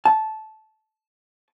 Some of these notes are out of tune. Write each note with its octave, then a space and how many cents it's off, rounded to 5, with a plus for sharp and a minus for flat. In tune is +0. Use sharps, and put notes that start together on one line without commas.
A5 -15